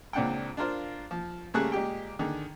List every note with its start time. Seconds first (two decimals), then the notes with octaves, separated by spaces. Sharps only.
0.13 C#2 A#2 C4 D4 F#5 G5
0.57 D4 F4 A#4 C5 F5
1.11 F3
1.54 C#3 G3 A3 A#3 G#4 F#6
1.72 A#2 G#3 G4 G5
2.19 D3 D#3 G#4